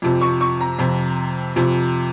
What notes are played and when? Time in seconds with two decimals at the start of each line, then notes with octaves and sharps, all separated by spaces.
0.02 F2 C3 F3
0.21 C#6
0.41 C#6
0.61 A#5
0.79 F2 C3 F3
1.56 F2 C3 F3